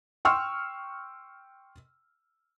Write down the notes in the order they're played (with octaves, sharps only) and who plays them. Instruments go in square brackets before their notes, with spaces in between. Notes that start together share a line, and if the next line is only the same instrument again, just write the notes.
[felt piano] G5 C6 C#6 E6 F6